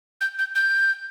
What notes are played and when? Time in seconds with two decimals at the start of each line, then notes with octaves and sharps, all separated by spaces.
0.21 G6
0.39 G6
0.55 G6